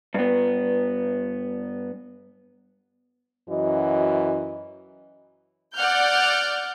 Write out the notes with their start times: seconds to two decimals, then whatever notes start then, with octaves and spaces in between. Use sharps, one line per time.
0.14 G2 B3
3.50 F#2 E3 F#4 D#5
5.75 D5 F#5 F6 G6